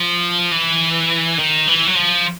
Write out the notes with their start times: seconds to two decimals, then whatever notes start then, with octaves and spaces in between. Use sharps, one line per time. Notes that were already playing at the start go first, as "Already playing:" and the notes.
Already playing: F3
0.52 E3
1.38 D#3
1.67 E3
1.87 F#3
1.95 F3